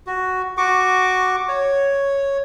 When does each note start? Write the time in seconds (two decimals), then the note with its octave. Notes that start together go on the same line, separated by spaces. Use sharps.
0.07 F#4
0.57 F#4 C#6 D6
1.49 C#5